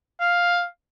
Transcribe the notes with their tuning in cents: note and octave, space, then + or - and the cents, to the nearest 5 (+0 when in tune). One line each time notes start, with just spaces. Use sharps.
F5 +5